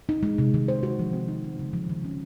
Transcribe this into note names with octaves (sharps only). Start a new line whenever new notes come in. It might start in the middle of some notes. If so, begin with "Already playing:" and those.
D#4
G#3
C3
D#3
C5
F#4
F3
C4
D#4
G#3
C#3
F3
D#3
C#4